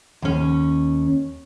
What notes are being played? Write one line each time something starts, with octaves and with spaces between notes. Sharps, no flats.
D#2 C#4